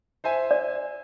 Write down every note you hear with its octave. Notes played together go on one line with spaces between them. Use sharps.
C5 E5 G#5
D5